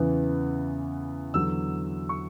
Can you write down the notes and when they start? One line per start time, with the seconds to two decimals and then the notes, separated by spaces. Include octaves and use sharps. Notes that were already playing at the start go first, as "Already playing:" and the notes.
Already playing: E2 C#3 E3 B3
1.34 E2 D3 F#3 E6
2.09 C#6